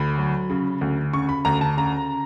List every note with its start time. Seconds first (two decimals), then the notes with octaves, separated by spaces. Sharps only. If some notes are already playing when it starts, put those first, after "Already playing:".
Already playing: D2 B5
0.18 F#3
0.50 C#3
0.81 D2
1.13 C#3 C#6
1.29 B5
1.45 D2 A#5
1.61 A5
1.77 C#3 A#5